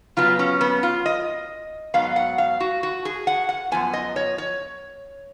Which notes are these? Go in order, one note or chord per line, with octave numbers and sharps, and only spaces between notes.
C#3 F#3 B3 F4
C#4
B3
F4
D#5
G#2 F#3 B3 F5
F#5
F5
F#4
F#4
G#4
F#5
F#5
F#2 F3 B3 G#5
D#5
C#5
C#5